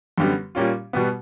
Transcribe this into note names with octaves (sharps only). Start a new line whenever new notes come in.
F#2 D3 G3 B3
A#2 G3 A#3 C#4 F4
B2 G3 B3